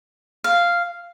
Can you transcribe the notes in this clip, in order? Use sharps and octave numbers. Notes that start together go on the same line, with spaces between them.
F5